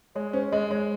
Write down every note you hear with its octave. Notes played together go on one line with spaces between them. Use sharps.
G#3 C#5
C#4 C5
G#3 D#5
G#3 C#5